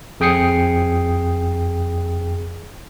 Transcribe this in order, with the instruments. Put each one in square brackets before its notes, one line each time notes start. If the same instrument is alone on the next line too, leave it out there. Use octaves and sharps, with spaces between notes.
[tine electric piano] F2 G#4 G5 D#6 C7 C#7